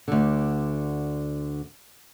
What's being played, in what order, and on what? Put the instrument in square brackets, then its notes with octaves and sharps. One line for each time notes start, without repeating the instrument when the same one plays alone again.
[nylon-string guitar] D2 D3